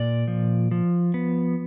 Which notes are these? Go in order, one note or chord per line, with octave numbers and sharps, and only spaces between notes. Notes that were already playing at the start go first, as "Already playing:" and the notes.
Already playing: A#2 D5
F3
F3
B3